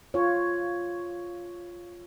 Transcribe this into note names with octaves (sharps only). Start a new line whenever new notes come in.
F4 C#5